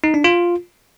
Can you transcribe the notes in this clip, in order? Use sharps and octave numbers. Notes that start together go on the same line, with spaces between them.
D#4
D4
F4